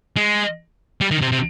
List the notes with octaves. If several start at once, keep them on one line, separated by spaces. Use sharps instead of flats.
G#3
G3
D#3
C3
C3